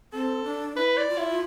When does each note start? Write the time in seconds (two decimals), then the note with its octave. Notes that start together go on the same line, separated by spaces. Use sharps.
0.13 C4 A4
0.44 D4
0.76 E4 B4
0.97 D5
1.09 F4
1.18 E4